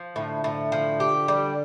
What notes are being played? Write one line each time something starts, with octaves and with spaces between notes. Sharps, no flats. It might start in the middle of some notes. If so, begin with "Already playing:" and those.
Already playing: F3
A2 D3
A2
F3
G4
G3